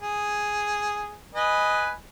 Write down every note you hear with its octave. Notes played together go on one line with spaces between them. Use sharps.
G#4
B4 D#5 G#5